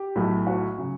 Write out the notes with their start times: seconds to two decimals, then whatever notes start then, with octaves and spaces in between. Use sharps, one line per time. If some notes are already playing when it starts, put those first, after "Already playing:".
Already playing: G4
0.16 B1 A2 F#3 A3
0.47 F#4
0.78 C#3 F#3